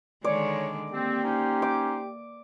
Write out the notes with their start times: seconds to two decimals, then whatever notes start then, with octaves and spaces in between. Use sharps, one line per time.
0.24 D3 D#3 G#3 C#5 D5
0.92 A#3 C4 G4
1.23 C#4 D#4 C5
1.62 D6